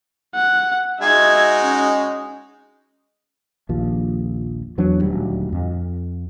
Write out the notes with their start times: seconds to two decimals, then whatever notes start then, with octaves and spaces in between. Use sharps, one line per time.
0.35 F#5
1.00 G#3 D#4 F#4 E5 G#6
1.60 C#4
3.69 A#1 D#2 F3
4.78 E2 E3 F#3 D4
5.02 D#1 D2 F#3 G3
5.52 F2